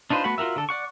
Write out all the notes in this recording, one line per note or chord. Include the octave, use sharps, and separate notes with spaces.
D4 D#4 F4 B4 C5
A3 B3 F#4 F#5 B5
F4 F#4 A#4 E5
D3 A4
D5 F#5 C#6